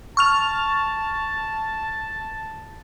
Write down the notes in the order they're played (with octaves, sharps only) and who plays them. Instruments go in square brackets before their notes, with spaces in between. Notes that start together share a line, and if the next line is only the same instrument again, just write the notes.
[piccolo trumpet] A5 [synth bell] C#6 F6 F7